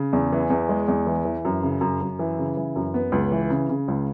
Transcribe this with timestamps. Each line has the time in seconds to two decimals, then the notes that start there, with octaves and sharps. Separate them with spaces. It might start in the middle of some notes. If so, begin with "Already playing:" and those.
Already playing: C#3
0.13 E2
0.32 E3
0.50 E2
0.69 G#3
0.88 E2
1.07 E3
1.25 E3
1.45 F#2
1.63 C#3
1.81 F#2
2.01 F#2
2.19 E3
2.38 C#3
2.57 E3
2.76 F#2
2.94 B3
3.12 C#2
3.32 E3
3.50 C#3
3.69 C#3
3.88 C#2